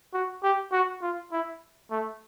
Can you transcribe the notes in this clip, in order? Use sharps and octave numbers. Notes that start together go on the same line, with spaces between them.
F#4
G4
F#4
F4
E4
A3